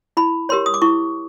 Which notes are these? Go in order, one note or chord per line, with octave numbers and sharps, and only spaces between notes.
E4 B5
G4 A#4 C#5 C6
D#6
D6
E4 C#6